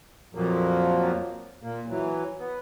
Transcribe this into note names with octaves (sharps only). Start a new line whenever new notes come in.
F2 A#2 F3 F#3 A#3
A#2 A#3
E3 F#3
B3